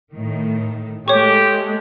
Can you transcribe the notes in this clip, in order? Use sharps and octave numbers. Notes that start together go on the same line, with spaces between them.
A2 D#3
G#3 A3 G4 C#5 C#6